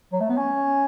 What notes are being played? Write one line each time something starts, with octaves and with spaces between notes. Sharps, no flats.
F#3
A3
B3
C#4